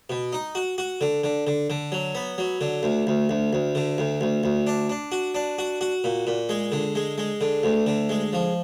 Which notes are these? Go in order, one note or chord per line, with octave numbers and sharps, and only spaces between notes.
B2
D#4
F#4
F#4
D3
D3
D3
D3
F#3
B3
F#3
D3
D2
D2
D2
D2
D3
D2
D2
D2
D4
D4
F#4
D4
F#4
F#4
A#2
A#2
G#3
D3
G#3
G#3
D3
D2
D3
G#3
F3